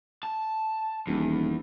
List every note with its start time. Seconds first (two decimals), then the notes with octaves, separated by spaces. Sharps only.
0.23 A5
1.07 D#1 E2